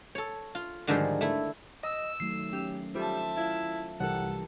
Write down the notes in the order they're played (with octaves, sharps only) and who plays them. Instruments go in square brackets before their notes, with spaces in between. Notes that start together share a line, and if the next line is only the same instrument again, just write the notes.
[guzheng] A4 C#5
F4
G#2 D3 D#3 F3 G3 G#4
A3 E4
[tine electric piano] D#5 [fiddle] E6
[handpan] D#3 F#3 A3 [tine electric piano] C7
[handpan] C#4 [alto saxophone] G4
[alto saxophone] G3 [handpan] F4 A4 C5 [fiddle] E5 A5
[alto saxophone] E4 [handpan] F4 F5
[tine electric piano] C2 [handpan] E3 G4 A#4 [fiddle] A4 [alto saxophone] F#5